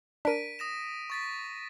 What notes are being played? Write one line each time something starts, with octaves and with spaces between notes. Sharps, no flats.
D4 A#4 B6 D7 D#7
D#6 A#6 E7
C#6 A6 B6